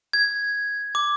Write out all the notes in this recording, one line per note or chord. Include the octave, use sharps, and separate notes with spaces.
G#6
D6